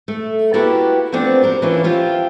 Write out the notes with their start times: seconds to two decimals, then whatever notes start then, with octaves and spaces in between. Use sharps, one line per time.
0.08 A3
0.54 A#3 E4 F#4 G4 B4 A5
1.12 F3 A3 B3 C4 D4
1.42 F#4 G4 A#4 C5
1.62 E3 A#3 C#4 D4 E4 F4
1.84 F3 F4 G4 E5